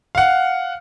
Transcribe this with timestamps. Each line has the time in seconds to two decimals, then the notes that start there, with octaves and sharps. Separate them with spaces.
0.15 F5 F#5